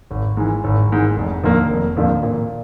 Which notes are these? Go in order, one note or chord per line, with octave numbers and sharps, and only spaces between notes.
G#1
G#2 E3
G#1
G#2 E3
F1
D#2 D3 F3 A#3
F1
D#2 D3 F3 A#3
A#2